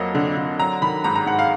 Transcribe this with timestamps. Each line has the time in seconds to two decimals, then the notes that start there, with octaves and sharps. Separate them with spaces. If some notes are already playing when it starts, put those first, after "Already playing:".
Already playing: F2 F#3 A#3 D#5
0.15 D3
0.37 D3
0.59 F#3 A#5
0.82 D#3 B5
1.04 G#2 A#5
1.15 A#5
1.26 G#2 F#5
1.39 F5